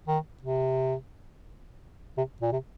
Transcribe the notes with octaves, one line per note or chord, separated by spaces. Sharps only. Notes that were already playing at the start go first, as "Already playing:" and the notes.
D#3
C3
C3
A#2
C3